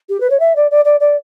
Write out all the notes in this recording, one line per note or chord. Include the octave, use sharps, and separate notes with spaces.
G4
B4
C#5
E5
D5
D5
D5
D5